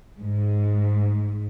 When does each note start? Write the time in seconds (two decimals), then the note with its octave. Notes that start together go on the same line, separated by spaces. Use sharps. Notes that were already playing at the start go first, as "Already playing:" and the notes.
0.19 G#2